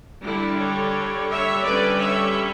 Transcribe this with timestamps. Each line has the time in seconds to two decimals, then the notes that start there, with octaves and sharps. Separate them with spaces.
0.24 D3 G3 D4 E4
0.59 A4 C#5
1.30 C#5 E5
1.65 D3 G3 C#4 B4 D5
2.00 C#5 E5